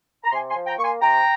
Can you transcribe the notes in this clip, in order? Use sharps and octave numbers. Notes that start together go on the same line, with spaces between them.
A#5
C3 G#5 C6
G#5 C6
F3
G5 A#5
A#3 C#6
G#5 C6
C3 G5 A#5